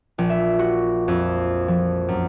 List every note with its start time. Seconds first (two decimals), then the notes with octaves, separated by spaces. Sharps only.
0.18 A#1
0.30 E5
0.59 F#4
1.08 F2
1.68 F3
2.08 F#2